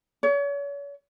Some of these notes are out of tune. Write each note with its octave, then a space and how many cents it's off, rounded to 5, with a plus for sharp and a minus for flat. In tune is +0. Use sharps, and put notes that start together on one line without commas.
C#5 +40